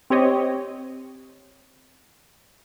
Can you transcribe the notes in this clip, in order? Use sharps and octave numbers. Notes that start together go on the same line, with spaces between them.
C4 G4 C#5 D#5